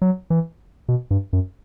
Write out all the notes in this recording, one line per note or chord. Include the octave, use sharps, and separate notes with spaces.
F#3
E3
B2
G2
F#2